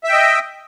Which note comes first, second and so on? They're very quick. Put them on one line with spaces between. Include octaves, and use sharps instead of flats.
E5 G5 D#5